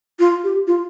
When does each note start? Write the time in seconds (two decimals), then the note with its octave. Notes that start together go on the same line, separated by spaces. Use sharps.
0.19 F4
0.44 G4
0.67 F4